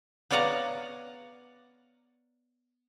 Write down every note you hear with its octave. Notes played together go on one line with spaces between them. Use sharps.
B3 C#5 D5 F5 F#5 A#5